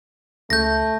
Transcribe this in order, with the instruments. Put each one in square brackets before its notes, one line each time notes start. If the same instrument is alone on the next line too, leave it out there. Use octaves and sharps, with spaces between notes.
[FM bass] C#2 [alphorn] A3 [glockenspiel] G6 A#6